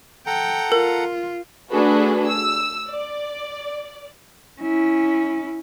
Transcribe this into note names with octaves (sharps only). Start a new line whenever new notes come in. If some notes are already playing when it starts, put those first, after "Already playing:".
A4 F#5 G5 A#5
F4 A#4
A3 D4 F#4 G#4 A4 B4
E6
D5
C#4 E4